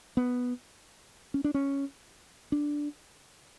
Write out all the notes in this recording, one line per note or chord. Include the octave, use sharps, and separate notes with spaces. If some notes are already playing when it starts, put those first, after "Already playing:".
B3
C#4
D4
C#4
D4